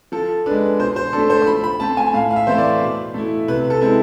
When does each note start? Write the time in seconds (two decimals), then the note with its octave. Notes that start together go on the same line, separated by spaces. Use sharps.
0.12 F3 A4
0.46 D4 B4
0.51 G#3
0.79 B2 C5
0.96 C5
1.13 D4 A4
1.18 A3
1.30 C5
1.42 C6
1.47 F3 B5
1.64 B5
1.80 A3 C4 A5
1.97 G#5
2.13 A2 F5
2.31 F5
2.36 E5
2.47 E3 A3 C4 E4 C5
2.58 D5
2.81 B2
3.14 A3 E4
3.48 C3 B4
3.70 A4
3.82 G#3 C4 E4